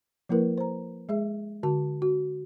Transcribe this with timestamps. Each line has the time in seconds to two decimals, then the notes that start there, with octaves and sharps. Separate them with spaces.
0.29 F3 A#3 E4 A#4 B4
0.58 C5 A#5
1.09 G#3 G#4 E5
1.63 D3 F#4 A5
2.02 F#4